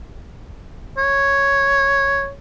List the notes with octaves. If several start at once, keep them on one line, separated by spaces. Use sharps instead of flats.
C#5